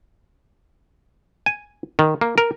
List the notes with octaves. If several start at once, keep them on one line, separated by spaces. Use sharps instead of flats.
G#5
D#3
A#3
A#4